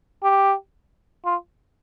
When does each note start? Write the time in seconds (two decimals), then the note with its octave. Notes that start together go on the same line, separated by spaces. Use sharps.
0.23 G4
1.25 F4